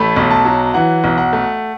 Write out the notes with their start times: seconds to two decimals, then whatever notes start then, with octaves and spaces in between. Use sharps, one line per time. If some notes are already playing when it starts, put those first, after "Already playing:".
Already playing: A1 A3 B5
0.16 B1
0.30 A5
0.45 F#3
0.74 E3 F#5
1.04 B1
1.18 F#5
1.33 A3